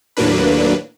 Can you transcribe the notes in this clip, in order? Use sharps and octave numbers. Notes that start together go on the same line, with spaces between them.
D#2 A2 F#3 A#3 D4 B4